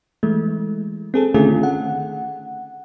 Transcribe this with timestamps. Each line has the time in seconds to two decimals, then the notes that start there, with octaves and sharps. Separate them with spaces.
0.23 E3 G#3 A3
1.14 C4 G#4 A4
1.34 D3 D#3 A3 C#4 F4 G#4
1.63 F#5